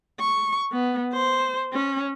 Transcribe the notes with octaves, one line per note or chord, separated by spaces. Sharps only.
C#6
B3
C5
C#4